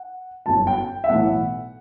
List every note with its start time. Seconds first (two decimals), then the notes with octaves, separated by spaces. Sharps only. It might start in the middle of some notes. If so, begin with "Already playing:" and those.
Already playing: F#5
0.46 G1 F#2 F#3 A5
0.67 G5
1.04 E5
1.09 B1 A2 E3 F#5